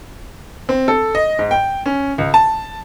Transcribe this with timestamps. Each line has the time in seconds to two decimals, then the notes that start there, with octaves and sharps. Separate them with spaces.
0.69 C4
0.88 A4
1.15 D#5
1.39 G#2
1.51 G5
1.86 C#4
2.18 C#2
2.34 A5